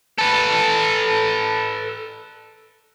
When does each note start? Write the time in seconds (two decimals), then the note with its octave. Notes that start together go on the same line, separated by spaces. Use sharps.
0.19 A4 B4